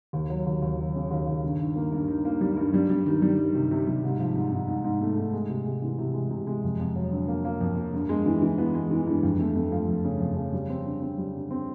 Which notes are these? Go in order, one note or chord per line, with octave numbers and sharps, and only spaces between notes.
D#2
F#3
D#2
D#2
F#3
C#3
D#2
D#2
G2
D#3
A#3
G2
D#3
A#3
G3
G2
G3
G3
D#3
G3
D#3
C3
C3
G3
G#2
F3
G#2
G#2
G#2
G#2
A3
G#2
G#3
C3
G#3
E3
C3
G#3
C3
G#3
F2
F2
F#3
D3
A#3
A#3
F2
A#3
G2
G#3
E3
E3
B3
G#3
E3
G2
F2
A3
A3
F3
F2
C#3
F2
C#3
G3
C4
D3
C4
G3
D3
C4